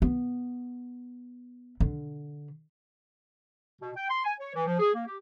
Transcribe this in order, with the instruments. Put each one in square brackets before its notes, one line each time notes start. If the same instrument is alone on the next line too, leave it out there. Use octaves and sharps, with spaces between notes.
[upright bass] B3
D3
[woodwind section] B2
G5
C6
G#5
C#5
E3
F3
G#4
A#3
G4